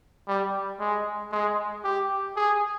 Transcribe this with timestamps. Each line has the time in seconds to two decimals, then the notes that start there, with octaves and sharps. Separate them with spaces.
0.27 G3
0.79 G#3
1.32 G#3
1.84 G4
2.36 G#4